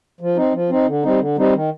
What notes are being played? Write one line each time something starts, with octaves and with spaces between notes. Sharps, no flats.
F3
C4 D#4
F3
C4 D#4
D3
G3 C4 D#4
D3
G3 C4 D#4
D#3